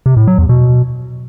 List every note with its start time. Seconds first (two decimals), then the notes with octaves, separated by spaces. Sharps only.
0.06 C3
0.17 A2
0.27 F#3
0.38 E2
0.49 B2